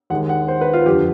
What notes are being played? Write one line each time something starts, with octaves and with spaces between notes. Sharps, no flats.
D#2 D#3 G#3 F#5
F#5
C5
B4
F4
F2 D3 F3 G4